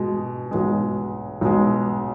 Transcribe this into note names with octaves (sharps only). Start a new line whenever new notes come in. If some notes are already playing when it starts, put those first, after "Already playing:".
Already playing: B2 G#3
B1 B2 G#3
B1 B2 G#3